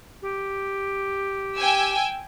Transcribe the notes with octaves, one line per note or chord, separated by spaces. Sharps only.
G4
G5 G#5 E6